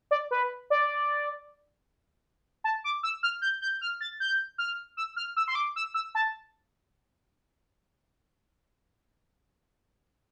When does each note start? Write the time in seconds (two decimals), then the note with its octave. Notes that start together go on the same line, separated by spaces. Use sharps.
0.11 D5
0.31 B4
0.70 D5
2.64 A5
2.84 D6
3.03 E6
3.23 F6
3.42 G6
3.62 G6
3.81 F6
4.01 A6
4.20 G6
4.58 F6
4.97 E6
5.16 F6
5.36 E6
5.48 C6
5.55 D6
5.76 E6
5.94 E6
6.15 A5